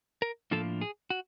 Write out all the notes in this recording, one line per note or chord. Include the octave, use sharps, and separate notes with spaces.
A#4
A2 F3 A#3 D4 F4 A4
G#4
F#4